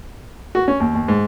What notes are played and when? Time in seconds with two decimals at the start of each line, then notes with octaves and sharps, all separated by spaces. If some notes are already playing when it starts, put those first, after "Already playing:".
0.55 F#4
0.68 C#4
0.80 D#2
0.95 D#2
1.08 G#2